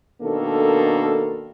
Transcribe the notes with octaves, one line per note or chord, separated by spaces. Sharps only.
B2 D#3 A#3 D4 A4